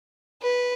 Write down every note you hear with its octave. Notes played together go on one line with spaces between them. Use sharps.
B4